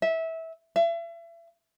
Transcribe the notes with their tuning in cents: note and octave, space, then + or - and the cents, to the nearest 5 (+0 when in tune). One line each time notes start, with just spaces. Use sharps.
E5 -20
E5 +35